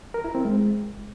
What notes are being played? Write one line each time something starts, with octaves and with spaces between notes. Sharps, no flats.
A#4
E4
C4
G#3